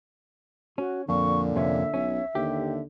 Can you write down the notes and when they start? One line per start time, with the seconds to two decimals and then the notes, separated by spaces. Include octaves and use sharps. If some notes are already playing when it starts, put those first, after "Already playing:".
0.78 C#4 F#4
1.09 F2 A#2 D3 C#6
1.56 F2 C3 C#4 E5
1.94 B1 C#4
2.35 D#2 D3 G4